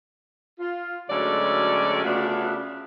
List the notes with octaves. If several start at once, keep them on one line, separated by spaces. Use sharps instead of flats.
F4
D2 F#3 G#3 C#4 A4 D5
C#3 A3 B3 D4 F4 F#4